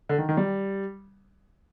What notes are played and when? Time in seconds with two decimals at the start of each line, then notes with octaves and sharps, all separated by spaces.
0.09 D3
0.18 D#3
0.29 D#3
0.37 G3